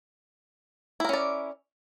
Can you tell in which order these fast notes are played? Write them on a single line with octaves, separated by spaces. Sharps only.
E4 A#4 C#4 D5